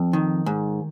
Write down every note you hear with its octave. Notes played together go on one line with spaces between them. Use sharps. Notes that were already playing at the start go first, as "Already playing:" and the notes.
Already playing: F2
D#3
G#2